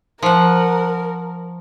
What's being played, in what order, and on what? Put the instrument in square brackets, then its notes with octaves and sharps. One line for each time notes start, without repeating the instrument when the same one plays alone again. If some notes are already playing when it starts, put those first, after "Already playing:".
[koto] F3 F#5 [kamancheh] A#4